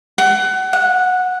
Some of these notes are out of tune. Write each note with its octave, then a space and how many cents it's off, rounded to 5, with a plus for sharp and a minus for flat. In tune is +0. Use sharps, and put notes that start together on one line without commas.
F#5 +25
F#5 -10